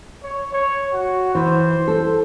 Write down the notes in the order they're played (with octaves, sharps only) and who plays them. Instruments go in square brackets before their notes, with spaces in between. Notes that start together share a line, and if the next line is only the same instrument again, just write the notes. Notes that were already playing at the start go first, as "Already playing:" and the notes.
[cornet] C#5
C#5
F#4
[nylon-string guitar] E3 [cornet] C5
[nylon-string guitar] A4